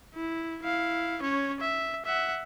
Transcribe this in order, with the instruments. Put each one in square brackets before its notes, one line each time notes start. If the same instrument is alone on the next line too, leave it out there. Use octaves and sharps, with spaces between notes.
[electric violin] E4
E4 F5
C#4 C#5
E5
E5 F#5